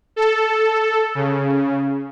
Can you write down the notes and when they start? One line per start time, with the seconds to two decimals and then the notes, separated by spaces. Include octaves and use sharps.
0.16 A4
1.15 C#3